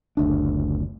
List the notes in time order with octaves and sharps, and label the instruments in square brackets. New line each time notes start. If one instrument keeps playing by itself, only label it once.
[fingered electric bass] F#1 D2 D4